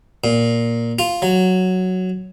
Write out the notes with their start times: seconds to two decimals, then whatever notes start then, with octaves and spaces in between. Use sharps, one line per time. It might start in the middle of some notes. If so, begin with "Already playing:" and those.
0.24 A#2
0.99 F4
1.22 F#3